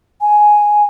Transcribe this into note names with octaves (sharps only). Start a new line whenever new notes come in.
G#5